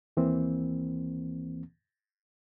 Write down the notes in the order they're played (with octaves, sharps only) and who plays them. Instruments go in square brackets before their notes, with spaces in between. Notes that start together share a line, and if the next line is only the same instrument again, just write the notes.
[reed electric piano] D#2 E3 A#3 C4